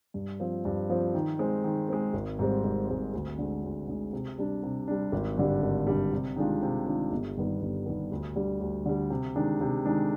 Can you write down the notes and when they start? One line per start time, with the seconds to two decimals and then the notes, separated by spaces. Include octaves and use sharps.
0.14 G2
0.40 F3 C4
0.65 G2
0.90 F3 C4
1.14 D#3
1.39 G#3 C4
1.64 D#3
1.89 G#3 C4
2.13 G#1
2.39 G#2 G3 C4
2.64 G#1
2.89 G#2 G3 C4
3.13 D2
3.38 D3 G#3
3.63 D2
3.88 D3 G#3
4.13 C3
4.38 G3 D4
4.63 C3
4.88 G3 D4
5.12 G#1
5.38 G2 D3 G3
5.63 G#1
5.87 G2 D3 G3
6.12 C3
6.36 D#3 G#3 D4 F4
6.62 C3
6.87 D#3 G#3 D4 F4
7.12 G1
7.37 G2 D#3 G3 B3
7.61 G1
7.86 G2 D#3 G3 B3
8.11 D2
8.36 D3 G3
8.60 D2
8.86 D3 G3
9.10 C3
9.35 D#3 G#3 D4
9.61 C3
9.85 D#3 G#3 D4